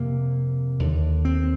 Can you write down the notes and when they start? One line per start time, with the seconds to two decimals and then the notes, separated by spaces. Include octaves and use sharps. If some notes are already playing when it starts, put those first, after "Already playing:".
Already playing: F2 C3 A#3
0.79 D#2 D3
1.25 C4